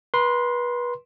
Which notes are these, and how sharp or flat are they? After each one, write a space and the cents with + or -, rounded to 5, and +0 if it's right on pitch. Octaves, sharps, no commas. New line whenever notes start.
B4 -30 C6 +0